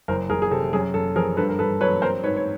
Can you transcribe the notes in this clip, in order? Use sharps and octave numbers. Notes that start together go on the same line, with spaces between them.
F#1 A#4 C5
F#1 G#4 A#4
G#4
C3 A4
F#2 G#4
F#2 A4
F3 G#4 A#4
G2 A4 B4
A#4
G2 A4 B4
F#3 B4 C#5
C4 A#4 C5
G#2 B4 C#5
C#5